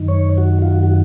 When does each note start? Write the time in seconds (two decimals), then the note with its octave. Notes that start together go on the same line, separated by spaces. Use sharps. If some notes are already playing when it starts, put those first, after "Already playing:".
Already playing: F#2 D#3
0.08 C#5
0.38 F#4
0.62 F4
0.68 F#4
0.83 F#4